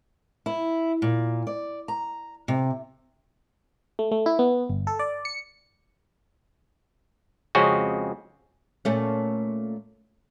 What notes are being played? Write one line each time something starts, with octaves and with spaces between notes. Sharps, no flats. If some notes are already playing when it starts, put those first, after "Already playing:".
E4
A#2
D5
A#5
C3
A3
A3
E4
B3
G1
A4
D5
C#7
F2 C#3 G#3 C4 C#4 F#4
A#2 A3 C#4